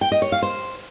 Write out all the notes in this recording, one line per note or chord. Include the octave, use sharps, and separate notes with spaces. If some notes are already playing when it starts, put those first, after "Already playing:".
G5
D#5
C#5
F5
C5